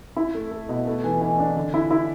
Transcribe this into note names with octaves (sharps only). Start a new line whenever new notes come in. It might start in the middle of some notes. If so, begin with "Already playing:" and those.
E4
A3
A3
B2
A3
E3
E3
D4
D3
E4
E4